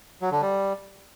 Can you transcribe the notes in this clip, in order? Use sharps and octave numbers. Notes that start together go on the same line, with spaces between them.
F#3
D3
G3